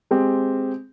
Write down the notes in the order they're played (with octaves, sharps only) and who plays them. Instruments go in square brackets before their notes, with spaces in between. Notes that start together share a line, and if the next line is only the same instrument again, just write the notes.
[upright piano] G#3 C4 G4